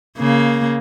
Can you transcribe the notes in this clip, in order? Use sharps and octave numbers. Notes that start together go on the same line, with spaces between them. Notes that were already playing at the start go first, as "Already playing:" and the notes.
C#3 A#3